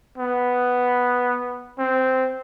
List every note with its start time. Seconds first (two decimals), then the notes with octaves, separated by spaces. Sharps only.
0.18 B3
1.79 C4